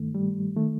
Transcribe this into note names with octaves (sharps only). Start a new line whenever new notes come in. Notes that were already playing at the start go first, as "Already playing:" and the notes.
Already playing: G2 D#3 A3
G3
D#3 A3